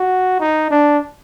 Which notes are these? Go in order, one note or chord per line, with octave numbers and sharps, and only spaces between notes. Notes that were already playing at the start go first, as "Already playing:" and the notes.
Already playing: F#4
D#4
D4